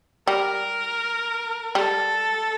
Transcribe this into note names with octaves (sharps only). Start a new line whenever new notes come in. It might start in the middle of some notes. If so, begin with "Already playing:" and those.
G3 A#4
G3 A4